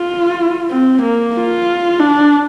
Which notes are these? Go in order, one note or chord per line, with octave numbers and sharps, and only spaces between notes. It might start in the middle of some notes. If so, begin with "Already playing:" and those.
Already playing: F4
C4
A#3
F4
D4